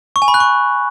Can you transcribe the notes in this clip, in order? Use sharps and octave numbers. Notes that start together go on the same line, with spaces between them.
C#6
G#5
B5
F#6
C#6